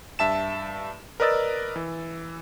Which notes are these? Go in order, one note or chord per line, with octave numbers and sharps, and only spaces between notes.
G2 E5 A5 E7
A#4 B4 D5 D#5 E6 A6
E3